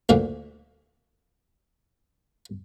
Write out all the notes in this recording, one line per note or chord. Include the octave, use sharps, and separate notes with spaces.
D2 A#2 D3